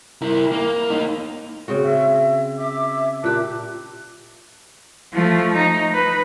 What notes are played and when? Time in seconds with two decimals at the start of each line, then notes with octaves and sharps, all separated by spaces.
0.22 E4 A#4
0.51 A#3
0.90 A#3 D#4
1.68 C#3 C4 F#4
1.85 E5
2.59 E5 D6
3.24 A#2 G4 A5 D6 F#6
5.13 F3 A3
5.55 D#4
5.93 B4